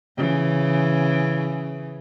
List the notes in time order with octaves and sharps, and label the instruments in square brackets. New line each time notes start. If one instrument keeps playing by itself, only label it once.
[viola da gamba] C#3 E3